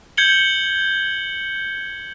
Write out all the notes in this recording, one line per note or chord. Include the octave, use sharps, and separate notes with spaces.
G6 G#6 C#7 F#7 G7